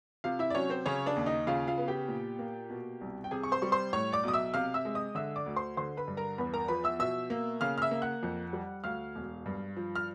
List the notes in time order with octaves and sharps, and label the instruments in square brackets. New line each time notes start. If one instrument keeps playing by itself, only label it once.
[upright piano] C3 F4 F5
E4 E5
D5
F#3 C#4 C#5
C4 C5
C#3 C#4 C#5
D4 D5
D#2
D#4 D#5
C#3 F4 F5
F4 F5
B3
G4 G5
A#2
A#3
B2
C2
G5
C3 G#4 G#5
C#6
C5 C6
G3 C#6
C5 C6
A2 C#5 C#6
D5 D6
B1 D#6
E5 E6
C3 F5 F6
E5 E6
G#3
D#5 D#6
D3 E5 E6
D5 D6
D2
C5 C6
D3 C5 C6
B4 B5
G2
A#4 A#5
E2 B4 B5
A#4 A#5
F3 B4 B5
E5 E6
B2 E5 E6
A#3
C#3 F5 F6
F6
E5 E6
A#3
F#5 F#6
F2
G3
D2 F5 F6
E1
G2
F3
F6